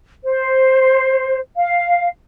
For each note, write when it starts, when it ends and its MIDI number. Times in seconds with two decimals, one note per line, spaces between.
0.24 1.40 72
1.56 2.09 77